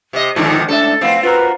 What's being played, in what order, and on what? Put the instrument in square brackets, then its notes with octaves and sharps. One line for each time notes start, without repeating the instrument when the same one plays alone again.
[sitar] C3 D#5
[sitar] G#2 D3 D#3 [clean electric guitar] B2 F3 [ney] D#4
[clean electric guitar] C#2 A2 E5 [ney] D4 [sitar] A4
[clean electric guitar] F2 A2 B3 [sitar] C4 [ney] F5
[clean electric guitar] F4 F#4 A#4 [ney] B4